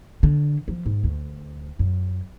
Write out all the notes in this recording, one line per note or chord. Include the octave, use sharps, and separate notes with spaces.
D3
F3
G#2
D2
F#2